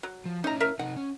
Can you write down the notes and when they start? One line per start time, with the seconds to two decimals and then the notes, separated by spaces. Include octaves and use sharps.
0.03 F#3
0.25 F3
0.44 C#4 D#4 E4 A#5
0.60 A#4 E5 F5
0.79 C3 D#4 F#5
0.96 C#4